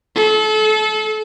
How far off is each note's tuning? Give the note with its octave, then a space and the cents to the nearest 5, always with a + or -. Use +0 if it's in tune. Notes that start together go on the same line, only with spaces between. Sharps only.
A4 -30